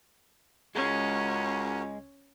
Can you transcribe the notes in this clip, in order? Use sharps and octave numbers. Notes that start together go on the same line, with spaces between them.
C#2 G#3 C#4 F#4 A#4